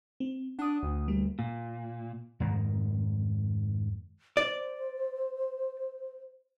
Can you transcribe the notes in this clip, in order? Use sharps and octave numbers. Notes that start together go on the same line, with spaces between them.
C4
D4 F#5 D#6
D2
G3 A#3
A#2
F2 G#2 D#3 A#3
C5 D5